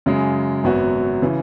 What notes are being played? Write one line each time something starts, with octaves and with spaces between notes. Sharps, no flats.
F#2 C#3 G#3
G#1 F#2 F#3 B3 F#4
C#3 E3